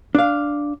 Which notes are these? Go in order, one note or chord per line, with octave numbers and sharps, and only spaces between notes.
D4 F5